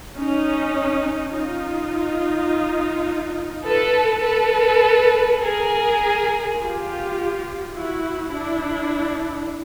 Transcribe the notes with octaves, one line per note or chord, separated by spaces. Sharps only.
C#4 D#4
D#4 F4
A4 B4
A4 B4
G#4 A#4
F4 G4
E4 F#4
D4 E4